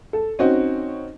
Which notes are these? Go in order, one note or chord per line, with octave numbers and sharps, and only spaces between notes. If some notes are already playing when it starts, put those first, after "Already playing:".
A4
C4 C#4 D#4 F#4 D#5